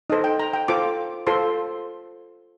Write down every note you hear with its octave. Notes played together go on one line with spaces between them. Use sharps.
D#4 A4 C5 D#5
G5
A#5
G5
F4 A4 C5 D6
F4 A4 C5 C6